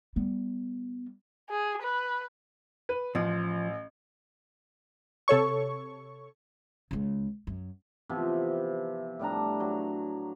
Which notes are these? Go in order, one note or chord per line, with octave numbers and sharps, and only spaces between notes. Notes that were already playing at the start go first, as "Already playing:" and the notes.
G3 B3
G#4
B4
B4
A1 F3
C3 A4 C#5 C#6
C#2 C#3
F#2
C3 E3 F3 B3
A2 G3 D4 A#5
F#3